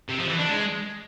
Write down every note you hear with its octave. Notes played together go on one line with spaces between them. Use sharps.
C3
F3
E3
D4
G#3